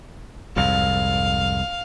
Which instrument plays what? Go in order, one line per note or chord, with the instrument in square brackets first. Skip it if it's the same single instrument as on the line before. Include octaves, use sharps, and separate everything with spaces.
[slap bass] C2 F2 G#2 [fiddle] F5